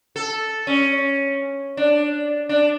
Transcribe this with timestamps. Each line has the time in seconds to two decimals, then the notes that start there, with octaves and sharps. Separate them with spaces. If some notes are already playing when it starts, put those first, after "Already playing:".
0.16 A4
0.67 C#4
1.77 D4
2.49 D4